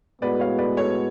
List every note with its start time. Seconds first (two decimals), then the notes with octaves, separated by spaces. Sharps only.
0.22 A2 G#3 B3 F#4 B4 D5
0.40 C#5 F5
0.58 B4 D5
0.77 A4 C#5